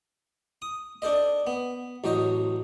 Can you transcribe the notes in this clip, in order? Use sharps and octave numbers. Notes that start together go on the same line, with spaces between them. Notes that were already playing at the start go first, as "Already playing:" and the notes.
D#6
D4 A4 C5 D#5
B3
A1 F#3 C5 D#5